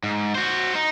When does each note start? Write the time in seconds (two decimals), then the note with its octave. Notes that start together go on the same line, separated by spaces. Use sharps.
0.03 G#2
0.35 F#4 C5
0.75 D#4